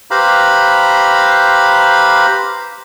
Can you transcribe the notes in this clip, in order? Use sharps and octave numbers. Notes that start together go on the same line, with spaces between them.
G4 B4 C5 F5 A#5 B5